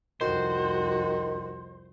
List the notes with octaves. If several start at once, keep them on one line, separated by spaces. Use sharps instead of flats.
C2 F2 D#3 F#4 C5